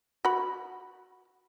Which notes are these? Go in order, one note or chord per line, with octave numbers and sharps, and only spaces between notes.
F#4 B5